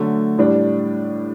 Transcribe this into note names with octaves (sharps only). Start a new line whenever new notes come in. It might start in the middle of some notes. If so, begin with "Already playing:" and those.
Already playing: D3 F#3 A3
A2 G3 D4